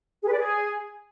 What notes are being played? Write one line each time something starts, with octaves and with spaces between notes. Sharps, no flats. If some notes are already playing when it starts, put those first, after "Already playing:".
G#4
B4
D5
G#4